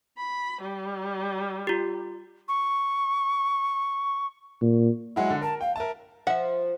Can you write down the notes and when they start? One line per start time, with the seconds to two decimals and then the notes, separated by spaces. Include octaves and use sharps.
0.18 B5
0.62 G3
1.67 F4 G4
2.48 C#6
4.61 A#2
5.16 F#3 G#3 E4 F#5
5.30 D3
5.41 A#4 A5
5.61 F5 G5
5.76 A#4 E5 A5
6.27 F3 E5 F#5